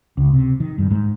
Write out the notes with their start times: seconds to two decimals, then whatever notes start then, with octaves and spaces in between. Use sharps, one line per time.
0.17 C#2
0.33 C3
0.60 D#3
0.78 G2
0.91 G#2